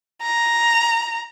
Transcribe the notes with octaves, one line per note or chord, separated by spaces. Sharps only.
A#5